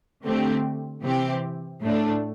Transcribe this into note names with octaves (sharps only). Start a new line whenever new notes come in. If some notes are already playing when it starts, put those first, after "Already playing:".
D3 A3 C4 G4
C3 E3 C4 G4
A2 A3 D4